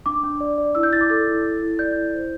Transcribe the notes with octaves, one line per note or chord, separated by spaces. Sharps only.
D4 D6
D4
D5
D5
E4 E6
G6
E4 A6
D6
A4 A6
E4
A4
E4
D5 G6
E4
C5